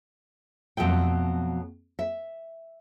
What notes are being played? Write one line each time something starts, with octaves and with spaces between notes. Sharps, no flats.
F2 B2 F#3 A3 G5
E5